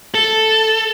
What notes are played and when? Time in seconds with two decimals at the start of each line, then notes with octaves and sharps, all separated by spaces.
0.14 A4